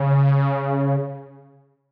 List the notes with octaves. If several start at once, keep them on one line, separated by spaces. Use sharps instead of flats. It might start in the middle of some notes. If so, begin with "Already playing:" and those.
Already playing: C#3